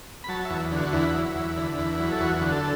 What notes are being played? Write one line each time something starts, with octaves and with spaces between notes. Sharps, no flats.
B5
F#3 A5
E2 E5
D3 F#4
E2 E4
F#3
E2
D3
E2
F#3
A4
E2 F#4
D3
F#4
A4